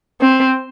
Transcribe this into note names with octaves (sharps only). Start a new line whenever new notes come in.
C4